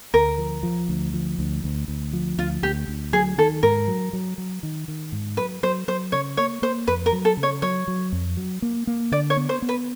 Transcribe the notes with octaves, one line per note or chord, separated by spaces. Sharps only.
D2 A#4
F3
F3
D2
F3
D2
D2
D2
F3
D2 F4
D2 G4
D2
F#3 G#4
D#3 A4
G#2 A#4
F#3
F#3
F#3
D#3
D#3
G#2
F#3 B4
F#3 C5
F#3 C5
C#3 C#5
A#3 C#5
A#3 C5
F2 B4
A#4
F#3
A4
C#3
C#5
F#3 C#5
F#3
F2
F#3
A#3
A#3
D3 D5
C#5
B3
C5
B3
B4